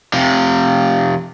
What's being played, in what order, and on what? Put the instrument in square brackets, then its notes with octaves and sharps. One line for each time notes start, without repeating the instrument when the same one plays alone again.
[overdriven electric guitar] C3 F3